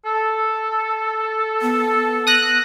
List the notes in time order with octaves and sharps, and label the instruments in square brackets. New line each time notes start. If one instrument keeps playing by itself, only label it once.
[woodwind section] A4
[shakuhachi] B3
[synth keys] D#6 F#6 A#6